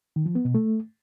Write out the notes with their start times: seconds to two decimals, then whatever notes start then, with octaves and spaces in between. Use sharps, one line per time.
0.16 D#3
0.26 F3
0.35 B3
0.45 B2
0.55 A3